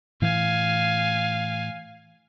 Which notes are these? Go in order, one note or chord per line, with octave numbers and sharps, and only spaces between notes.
A2 E3 F5 G#5